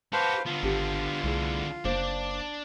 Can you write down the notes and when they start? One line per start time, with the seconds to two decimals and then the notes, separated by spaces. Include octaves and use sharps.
0.13 F#4 G4 B4 C5 F5 A5
0.46 D3 B3 F4
0.63 G#1 D4 G4 A4
1.24 C2 A3 E4 G#4
1.85 F#1 A#3 D4 A#4 C5 D5